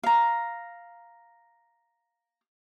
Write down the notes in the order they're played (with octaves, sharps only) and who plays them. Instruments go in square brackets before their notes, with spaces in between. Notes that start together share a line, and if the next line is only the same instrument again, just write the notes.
[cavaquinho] F5 A#5